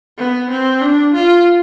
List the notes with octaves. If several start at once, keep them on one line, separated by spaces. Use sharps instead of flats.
B3
C4
D4
F4